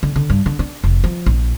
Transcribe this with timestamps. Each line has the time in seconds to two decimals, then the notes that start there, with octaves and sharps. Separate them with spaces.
0.03 D3
0.16 D3
0.30 G2
0.46 D3
0.59 D4
0.84 F1
1.04 F3
1.26 A#1